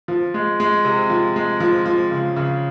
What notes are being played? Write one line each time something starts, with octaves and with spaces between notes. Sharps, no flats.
F3
G#3
G#3
C3
F3
G#3
F3
F3
C#3
C#3